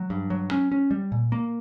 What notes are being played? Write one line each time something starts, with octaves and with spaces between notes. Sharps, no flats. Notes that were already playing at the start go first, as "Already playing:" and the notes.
Already playing: F#3
G2
F#3
C#4
C#4
G3
A#2
A#3